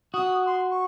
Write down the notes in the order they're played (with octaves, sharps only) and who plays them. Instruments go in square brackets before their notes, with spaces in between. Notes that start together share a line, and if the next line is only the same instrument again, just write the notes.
[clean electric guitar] F#4 [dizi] D#6
[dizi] C6
C#6